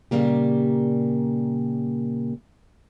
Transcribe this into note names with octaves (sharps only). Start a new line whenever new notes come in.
A#2 C#3 G3 A#3 G4